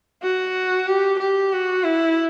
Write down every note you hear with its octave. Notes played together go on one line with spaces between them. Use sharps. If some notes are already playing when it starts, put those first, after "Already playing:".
F#4
G4
G4
F#4
E4